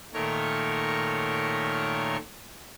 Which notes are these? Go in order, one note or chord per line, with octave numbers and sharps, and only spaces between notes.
A#2 D#3 A3 A#4 C#5 C#6